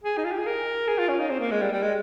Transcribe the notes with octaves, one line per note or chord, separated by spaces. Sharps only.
G#4
D#4
F4
G4
G#4
A#4
G#4
F4
C#4
D#4
C4
A#3
G#3
G3
G3
G#3